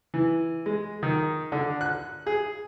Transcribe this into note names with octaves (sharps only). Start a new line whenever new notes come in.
E3
G#3
D#3
D3
F#6
G#4